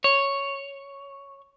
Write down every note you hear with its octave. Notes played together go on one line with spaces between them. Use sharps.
C#5